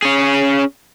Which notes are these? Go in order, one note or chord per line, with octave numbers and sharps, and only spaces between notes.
C#4 G#4